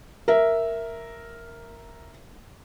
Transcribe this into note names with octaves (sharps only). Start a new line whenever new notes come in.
A#4 E5